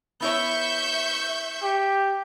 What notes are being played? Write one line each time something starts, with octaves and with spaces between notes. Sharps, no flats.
B3 E4 C#5 E5 C#6 G6
G4